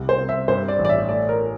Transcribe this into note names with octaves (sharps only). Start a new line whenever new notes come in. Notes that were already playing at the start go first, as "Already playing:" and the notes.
Already playing: C2 G3
C5
C4
E5
G2 C5
D5
A1
D5
E5
A3 D5
A#4